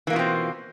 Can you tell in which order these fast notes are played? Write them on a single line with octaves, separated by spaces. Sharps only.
E3 A#3 B2 F4 C4